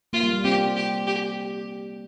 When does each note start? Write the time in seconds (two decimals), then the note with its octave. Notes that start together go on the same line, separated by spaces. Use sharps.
0.13 A#3 F4
0.23 G3
0.33 G3
0.44 C4 G4
0.76 G4
1.07 G4